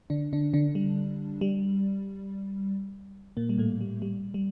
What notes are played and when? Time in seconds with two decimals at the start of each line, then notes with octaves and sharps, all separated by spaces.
0.10 D3 D4
0.33 D3 D4
0.53 D3 D4
0.75 G3
1.41 G3
3.37 A#2 A#3
3.49 G3
3.58 A2 A3
3.81 G3
4.02 G3
4.34 G3